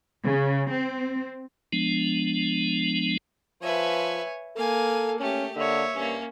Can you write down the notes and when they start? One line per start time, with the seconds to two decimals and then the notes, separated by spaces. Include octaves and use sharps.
0.23 C#3
0.69 C4
1.73 F3 G#3 B3 D4
3.62 F3 B4 C#5 E5 G#5
4.56 A#3 A4 F5 G#5
5.20 A3 C#4 G4
5.56 D3 A#3 C#5 E5
5.95 G2 A#3 C#4